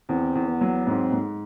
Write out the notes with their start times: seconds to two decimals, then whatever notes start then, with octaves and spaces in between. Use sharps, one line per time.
0.09 E2 C4
0.35 E2
0.48 B3
0.61 F#3
0.87 G#2 C4
1.12 G#2